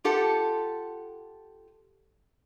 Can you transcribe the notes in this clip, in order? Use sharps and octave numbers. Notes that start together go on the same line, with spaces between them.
F4 G4 A4 F#5